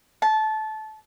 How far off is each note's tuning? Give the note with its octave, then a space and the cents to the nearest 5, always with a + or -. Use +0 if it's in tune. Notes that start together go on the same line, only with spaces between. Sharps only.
A5 -20